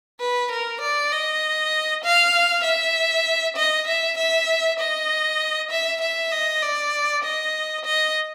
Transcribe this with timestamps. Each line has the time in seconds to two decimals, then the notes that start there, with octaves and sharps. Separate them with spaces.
0.20 B4
0.51 A#4
0.81 D5
1.12 D#5
2.04 F5
2.64 E5
3.56 D#5
3.87 E5
4.17 E5
4.79 D#5
5.70 E5
6.01 E5
6.32 D#5
6.62 D5
7.24 D#5
7.85 D#5